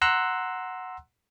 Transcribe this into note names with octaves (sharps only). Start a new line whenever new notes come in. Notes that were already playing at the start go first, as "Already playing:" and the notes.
F#5 A#5 C6 E6 F#6